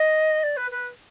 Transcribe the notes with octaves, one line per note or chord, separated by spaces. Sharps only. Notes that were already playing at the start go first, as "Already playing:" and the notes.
Already playing: D#5
D5
B4
B4